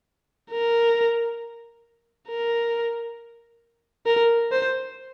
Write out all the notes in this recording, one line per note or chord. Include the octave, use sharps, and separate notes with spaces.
A#4
A#4
A#4
C5